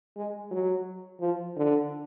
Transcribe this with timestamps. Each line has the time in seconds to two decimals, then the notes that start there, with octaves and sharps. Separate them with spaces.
0.17 G#3
0.51 F#3
1.21 F3
1.56 D3